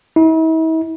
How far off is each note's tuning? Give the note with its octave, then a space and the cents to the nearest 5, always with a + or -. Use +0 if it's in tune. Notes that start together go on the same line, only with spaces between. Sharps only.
E4 -45